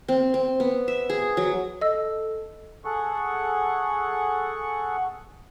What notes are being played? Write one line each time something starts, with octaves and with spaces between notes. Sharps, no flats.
C4
C4
B3
E5
G#4
F#3
A4 D#5 E6
G#4 A4 F#5 C#6